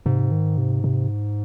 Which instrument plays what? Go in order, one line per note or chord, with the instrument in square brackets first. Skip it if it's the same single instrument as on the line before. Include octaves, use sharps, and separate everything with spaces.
[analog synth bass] G#2 [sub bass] C3
[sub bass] D#3
C3
C3